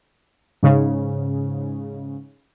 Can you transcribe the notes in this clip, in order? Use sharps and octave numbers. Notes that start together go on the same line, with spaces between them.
G#2 C#3